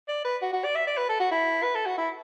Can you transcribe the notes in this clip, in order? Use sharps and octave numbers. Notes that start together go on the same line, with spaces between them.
D5
B4
F#4
F#4
D5
E5
D5
B4
A4
F#4
E4
B4
A4
F#4
E4